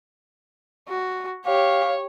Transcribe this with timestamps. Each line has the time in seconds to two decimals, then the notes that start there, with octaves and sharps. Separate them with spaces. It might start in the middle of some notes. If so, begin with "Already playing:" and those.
0.88 F#4
1.46 G4 C#5 F5